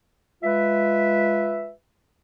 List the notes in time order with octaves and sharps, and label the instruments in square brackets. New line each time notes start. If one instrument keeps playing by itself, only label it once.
[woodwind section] G#3 F4 B4 E5